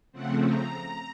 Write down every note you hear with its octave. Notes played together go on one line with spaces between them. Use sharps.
C#3 F3 A3 C4 F#5
A#5